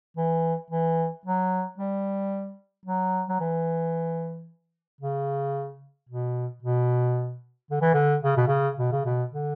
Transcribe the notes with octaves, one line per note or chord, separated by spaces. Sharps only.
E3
E3
F#3
G3
F#3
F#3
E3
C#3
B2
B2
D3
E3
D3
C#3
B2
C#3
B2
C#3
B2
D3